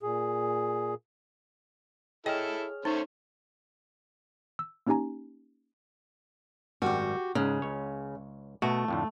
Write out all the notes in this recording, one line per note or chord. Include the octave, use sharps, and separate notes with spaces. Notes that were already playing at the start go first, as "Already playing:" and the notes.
A#2 G#4
E4 G#4 A4 C#5 D#5 G5 F6
A3 C#4 D#4 C5
E6
A#3 C#4 D#4 G4 G#5 A#5
G#1 F#2 G3 F#4 G4
G#2 C#3 G#3
C#2 C#5
B2 A3 F#4
F2 A2 D3